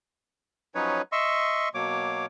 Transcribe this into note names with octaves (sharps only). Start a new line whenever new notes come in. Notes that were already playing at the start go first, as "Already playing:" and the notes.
F3 F#3 C#4 D#4 B4 C#5
D#5 E5 C6 C#6 E6
B2 F#3 A#3 C#5 D6